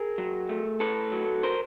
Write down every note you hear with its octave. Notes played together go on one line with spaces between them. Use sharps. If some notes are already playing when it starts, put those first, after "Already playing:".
Already playing: G#4 A#4
F#3
A3
A2 A4 B4
F#3
A#4 C5